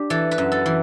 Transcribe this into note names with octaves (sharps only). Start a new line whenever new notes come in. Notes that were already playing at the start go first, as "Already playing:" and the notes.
Already playing: D4 G4
E3 A4
B4
F#2
A4
E3